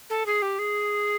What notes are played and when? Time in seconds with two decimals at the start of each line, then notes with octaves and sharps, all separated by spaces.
0.10 A4
0.26 G#4
0.42 G4
0.59 G#4